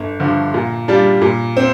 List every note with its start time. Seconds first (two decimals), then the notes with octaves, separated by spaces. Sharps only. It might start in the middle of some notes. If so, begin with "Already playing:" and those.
Already playing: G1
0.20 G2 D3 F3
0.54 A#2
0.88 G3 D4 F4
1.22 A#2
1.57 C4